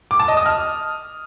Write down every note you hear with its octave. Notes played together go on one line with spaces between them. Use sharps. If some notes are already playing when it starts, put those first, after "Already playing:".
D6
A5
D#5
D#6
F6